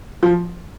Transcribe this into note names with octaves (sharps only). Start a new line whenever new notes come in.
F3